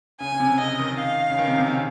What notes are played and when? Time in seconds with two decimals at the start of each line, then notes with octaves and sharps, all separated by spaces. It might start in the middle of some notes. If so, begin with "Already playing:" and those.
0.20 C#3 G#5
0.32 C#3
0.40 C3
0.59 C#3 D#5
0.79 D#3
0.99 F5
1.31 C#3
1.39 D#3
1.48 C3
1.58 C3
1.68 C#3